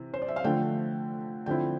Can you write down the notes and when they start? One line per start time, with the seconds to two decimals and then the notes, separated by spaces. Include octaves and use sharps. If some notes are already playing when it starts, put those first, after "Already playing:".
Already playing: C3 E3
0.14 C5
0.22 D5
0.28 E5
0.36 F5
0.44 D3 F3 A3 G5
1.46 D3 F3 C4 E4 G5